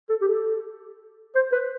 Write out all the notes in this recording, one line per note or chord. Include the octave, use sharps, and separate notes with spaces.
A4
G4
A4
C5
B4